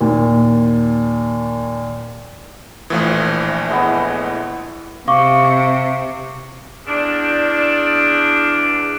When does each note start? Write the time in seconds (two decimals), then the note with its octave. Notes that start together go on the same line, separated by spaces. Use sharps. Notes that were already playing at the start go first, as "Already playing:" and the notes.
0.01 D#2 A#2
2.90 A#1 A2 E3 F3 D#6
3.70 G#3 B3 E4
5.08 C3 F5 C#6 D6
6.87 E2 D4